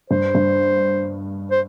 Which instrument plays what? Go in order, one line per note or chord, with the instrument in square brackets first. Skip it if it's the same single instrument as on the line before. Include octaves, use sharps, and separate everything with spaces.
[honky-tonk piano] G2 [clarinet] C5
[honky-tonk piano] G2
[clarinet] C5